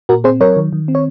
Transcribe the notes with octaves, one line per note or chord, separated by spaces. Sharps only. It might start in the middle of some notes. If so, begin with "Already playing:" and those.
A#2 F#4 A#4
C4 G#4 C5
F#3 A#4 C#5
D#3
D#3
C4
C#5